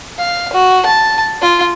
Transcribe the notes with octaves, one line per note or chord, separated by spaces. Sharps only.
F5
F#4
A5
F4